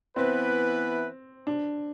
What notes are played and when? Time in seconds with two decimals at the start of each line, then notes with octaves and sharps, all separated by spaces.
0.16 E3 B3 C4 E4 B4
1.47 D4